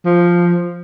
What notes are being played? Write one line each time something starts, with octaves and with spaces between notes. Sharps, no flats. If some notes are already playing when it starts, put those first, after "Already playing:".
F3